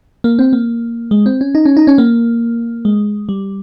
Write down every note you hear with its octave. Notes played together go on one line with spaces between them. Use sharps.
A#3
C4
A#3
G#3
C4
C#4
D#4
C#4
D#4
C#4
A#3
G#3
G3